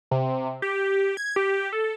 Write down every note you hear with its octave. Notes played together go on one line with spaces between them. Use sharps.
C3
G4
G#6
G4
A4